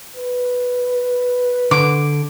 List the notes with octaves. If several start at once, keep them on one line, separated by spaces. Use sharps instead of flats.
B4
D3 D6